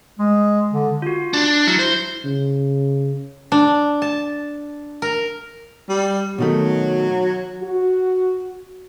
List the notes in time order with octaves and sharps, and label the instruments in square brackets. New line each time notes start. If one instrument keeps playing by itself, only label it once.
[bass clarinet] G#3
D3
[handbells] F4 F#4
[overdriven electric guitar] D4
[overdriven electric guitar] F#3 [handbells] E4
[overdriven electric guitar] C5
[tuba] C#3
[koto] D4
A5
A#4
[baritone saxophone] G3
[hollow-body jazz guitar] B2 D#3 A3 [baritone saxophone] F#3
[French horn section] F#4